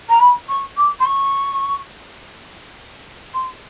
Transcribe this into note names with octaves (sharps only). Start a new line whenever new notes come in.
A#5
B5
C#6
D6
C6
C#6
C6